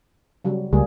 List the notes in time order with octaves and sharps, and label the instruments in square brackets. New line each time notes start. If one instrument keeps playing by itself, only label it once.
[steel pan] C#3 F#3 G3
[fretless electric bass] C#2 [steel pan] G3 A#3 G#4